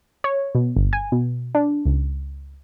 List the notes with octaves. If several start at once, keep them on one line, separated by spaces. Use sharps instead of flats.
C#5
B2
G1
G#5
B2
D4
C#2